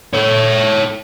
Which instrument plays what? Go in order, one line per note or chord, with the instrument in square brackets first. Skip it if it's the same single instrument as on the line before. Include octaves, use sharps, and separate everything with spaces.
[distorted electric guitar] A4 C#5